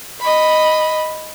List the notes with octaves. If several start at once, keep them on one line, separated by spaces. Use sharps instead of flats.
D#5 B5